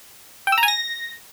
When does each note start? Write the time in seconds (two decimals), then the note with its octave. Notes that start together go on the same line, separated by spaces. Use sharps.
0.47 G5
0.52 E6
0.58 A#5
0.63 G#5
0.68 A#6